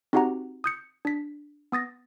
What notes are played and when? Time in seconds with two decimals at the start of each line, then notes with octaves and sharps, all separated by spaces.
0.13 C4 D#4 F#4 G4 F#5 A#5
0.64 D#6 G6 C#7
1.05 D4 B6
1.72 B3 D#6 A6 A#6